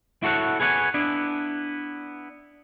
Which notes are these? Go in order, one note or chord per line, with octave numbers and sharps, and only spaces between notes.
E4 F#4 A4 C#5 F#5
G#4 B4 C#5 D5 F#5 G#5
B3 D4 E4